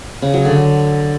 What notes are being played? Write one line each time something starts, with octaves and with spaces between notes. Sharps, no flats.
C#3
F#3
D3